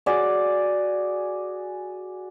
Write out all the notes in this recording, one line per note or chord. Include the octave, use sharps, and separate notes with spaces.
F#4 G#4 D5 D6